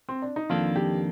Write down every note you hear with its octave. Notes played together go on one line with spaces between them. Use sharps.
C4
D4
D#4
F2 D#3 A#3 D4 F4 A4
G4